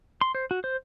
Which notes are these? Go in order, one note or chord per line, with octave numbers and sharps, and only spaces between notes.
C6
C5
F#4
C5